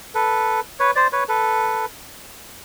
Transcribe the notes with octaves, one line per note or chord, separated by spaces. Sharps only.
A4 B4
B4 C#5
C5 D5
B4 C#5
A4 B4